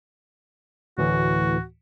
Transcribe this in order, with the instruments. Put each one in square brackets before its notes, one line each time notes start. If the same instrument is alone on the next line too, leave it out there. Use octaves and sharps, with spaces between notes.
[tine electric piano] D2 A2 E3 [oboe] F#4